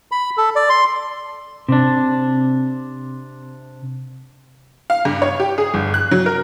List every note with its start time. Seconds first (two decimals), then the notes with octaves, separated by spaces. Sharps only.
0.12 B5
0.37 A4
0.56 D5
0.69 C6
1.69 C3 D4
4.90 F5
5.05 G2
5.22 C#5
5.40 G4
5.58 G#4
5.74 G1
5.94 F#6
6.11 F#3
6.26 A#4